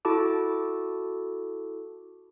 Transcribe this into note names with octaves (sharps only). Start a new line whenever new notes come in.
E4 F#4 A4 A5 D6